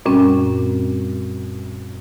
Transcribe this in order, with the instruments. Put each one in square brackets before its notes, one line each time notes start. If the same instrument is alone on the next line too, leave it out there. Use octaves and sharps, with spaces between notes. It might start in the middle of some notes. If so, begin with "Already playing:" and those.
[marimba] F#2 A#2 G3 C4 C#4